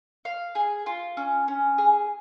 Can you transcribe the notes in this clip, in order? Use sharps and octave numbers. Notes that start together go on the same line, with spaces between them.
F5
G#4
F4
C#4
C#4
G#4